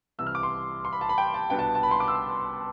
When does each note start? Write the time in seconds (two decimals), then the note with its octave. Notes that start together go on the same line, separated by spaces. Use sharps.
0.18 C2 C3 E3 E6
0.27 F6
0.35 D6
0.43 C6
0.85 C6
0.93 B5
1.01 A5
1.09 B5
1.18 G5
1.34 A5
1.50 C2 B2 B3 D4 G5
1.59 A5
1.75 A5
1.83 B5
1.91 C6
2.00 D6
2.08 E6